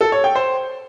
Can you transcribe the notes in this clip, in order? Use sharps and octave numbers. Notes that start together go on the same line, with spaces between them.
A4
C#5
G5
C5